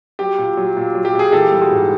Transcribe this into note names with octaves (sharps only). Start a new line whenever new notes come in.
F#3 G4
A#2
F#3
A#2
F#3
G4
A#2 G#4
E3 G4 A4
G3
F#4 G#4
G#2